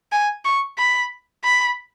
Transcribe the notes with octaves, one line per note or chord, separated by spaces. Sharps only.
G#5
C#6
B5
B5